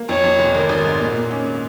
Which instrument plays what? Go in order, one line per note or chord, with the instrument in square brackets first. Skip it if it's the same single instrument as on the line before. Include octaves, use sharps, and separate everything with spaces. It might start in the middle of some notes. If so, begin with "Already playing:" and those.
Already playing: [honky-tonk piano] A#3
[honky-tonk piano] F2 [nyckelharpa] C#5
[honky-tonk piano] F2
F1
[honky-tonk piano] G#1 [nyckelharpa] A#4
[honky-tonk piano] G#1
G#2
A#2
A#2
C#4